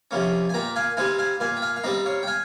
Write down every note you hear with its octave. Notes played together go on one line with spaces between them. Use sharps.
C3 F3 A#3 C#4
G#5
A#2 G5 A#5
F5 G#5
G3 C4 D#4 F5 G#5
F5 G#5
A#2 F5 G#5
G5
F5 G#5
F5
G3 C4 D#4 D#5 G5
C#5 F5
G5
F5 G#5